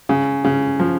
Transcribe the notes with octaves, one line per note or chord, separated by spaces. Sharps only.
C#3
C#3
F3